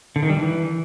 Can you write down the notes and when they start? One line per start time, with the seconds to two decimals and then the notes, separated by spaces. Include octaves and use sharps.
0.16 D3
0.23 D#3
0.30 G3
0.36 E3